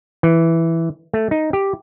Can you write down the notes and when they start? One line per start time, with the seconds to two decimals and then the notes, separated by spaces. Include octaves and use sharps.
0.23 E3
1.14 A3
1.31 D#4
1.53 G4